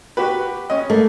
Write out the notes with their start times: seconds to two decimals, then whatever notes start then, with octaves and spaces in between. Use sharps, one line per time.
0.17 F#4 G4 B4
0.70 C#4 D#5
0.90 A3 A#3